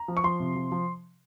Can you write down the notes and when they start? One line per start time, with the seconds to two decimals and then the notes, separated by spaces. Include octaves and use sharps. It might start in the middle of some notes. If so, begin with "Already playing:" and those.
Already playing: A#5
0.08 F3
0.17 C#6
0.24 F3 C6
0.40 C3
0.55 F3
0.72 F3